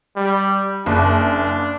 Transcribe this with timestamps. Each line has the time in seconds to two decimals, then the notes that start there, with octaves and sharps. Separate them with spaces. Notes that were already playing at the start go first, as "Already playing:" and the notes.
0.16 G3
0.86 F#1 D4